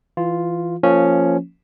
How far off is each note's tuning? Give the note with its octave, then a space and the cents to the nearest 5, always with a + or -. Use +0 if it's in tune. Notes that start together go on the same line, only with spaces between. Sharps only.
E3 +20 F4 +0
F3 +0 A#3 -20 C#4 +0